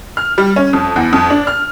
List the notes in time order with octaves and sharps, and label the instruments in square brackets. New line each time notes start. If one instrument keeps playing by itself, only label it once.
[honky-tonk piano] F6
G3
C#4
F2
E2
F2
D4
F6